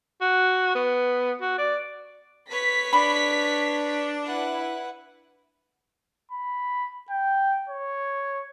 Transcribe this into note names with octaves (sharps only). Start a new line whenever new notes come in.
F#4
B3
F#4
D5
B4 C#5 B6
D4 B5
E4 B4 F#5
B5
G5
C#5